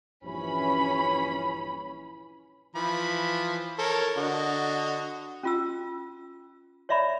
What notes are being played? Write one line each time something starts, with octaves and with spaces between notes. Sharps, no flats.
A#1 G2 E3 C#4 B5
E3 F3 B5
A4 A#4 C#5
D3 F#4 D#5
C#4 F4 E6
C#5 D5 E5 A#5 B5